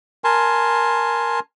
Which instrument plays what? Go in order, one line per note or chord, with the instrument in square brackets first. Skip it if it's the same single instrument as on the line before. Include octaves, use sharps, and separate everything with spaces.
[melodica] A#4 G#5 A5 C6